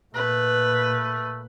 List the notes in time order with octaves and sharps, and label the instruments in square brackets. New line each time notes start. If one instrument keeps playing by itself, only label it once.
[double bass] A#2 [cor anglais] A3 [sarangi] B4